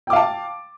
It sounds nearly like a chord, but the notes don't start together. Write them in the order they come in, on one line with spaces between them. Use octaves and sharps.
G5 D6 F5 A5